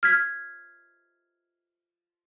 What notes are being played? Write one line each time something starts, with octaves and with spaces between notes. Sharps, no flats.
F6 G#6 B6